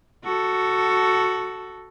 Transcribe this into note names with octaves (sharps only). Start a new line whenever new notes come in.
F#4 A4